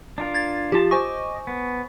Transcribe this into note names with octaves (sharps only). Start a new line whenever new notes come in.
D4 F4 A#4
G#6 A6
F3 F4 G4 A5
C5 D#5 G#5 C#6 D6
B3